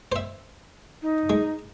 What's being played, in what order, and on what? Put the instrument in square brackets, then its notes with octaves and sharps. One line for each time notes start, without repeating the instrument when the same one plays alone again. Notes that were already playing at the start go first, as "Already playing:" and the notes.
[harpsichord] C5 E5
[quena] D#4
[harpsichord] G#3